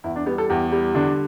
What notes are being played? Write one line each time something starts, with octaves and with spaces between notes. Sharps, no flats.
E2 E4
D4
G3 B3
A4
E2 G4
G3
D3 D4